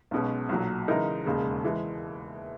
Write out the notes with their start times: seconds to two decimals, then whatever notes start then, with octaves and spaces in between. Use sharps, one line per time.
0.11 B1 B2 G#3 C#4
0.49 B1 A#2 F#3
0.88 C#3 E3 G#3 D#4 A#4
1.26 E1 D#2 C#3 G#3
1.64 E3 G#3